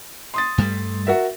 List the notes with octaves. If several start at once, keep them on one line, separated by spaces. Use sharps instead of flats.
C6 D#6 A6
G2 G3 A3
F#4 A#4 E5